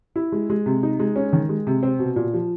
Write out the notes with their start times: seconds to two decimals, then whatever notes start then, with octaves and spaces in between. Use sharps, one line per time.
0.16 E4
0.32 G#3
0.50 G#3
0.66 C3
0.83 D#4
0.99 G#3
1.16 C#4
1.33 D#3
1.49 G#3
1.67 C3
1.83 C4
1.99 B2
2.16 A#2
2.34 F3